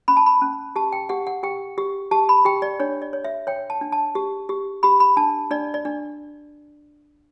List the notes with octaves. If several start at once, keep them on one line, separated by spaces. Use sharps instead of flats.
C#4 B5
A5
B5
C#4
G4 A5
G5
G4 F#5
F#5
G4 G5
G4
G4 A5
B5
G4 G5
D5
D4 C#5
D5
C#5
E5
C#5 G5
A5
D4
A5
G4
G4
G4 B5
B5
D4 A5
D4 D5
D5
D4